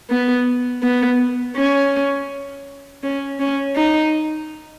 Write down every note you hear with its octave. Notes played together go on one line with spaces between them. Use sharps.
B3
B3
C#4
C#4
C#4
D#4